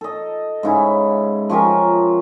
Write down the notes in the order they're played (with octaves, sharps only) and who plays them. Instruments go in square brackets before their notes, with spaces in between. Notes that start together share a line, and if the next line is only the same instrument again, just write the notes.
[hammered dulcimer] A4 D#5
G#2 C#3 E4
F3 C#4 G4 A#4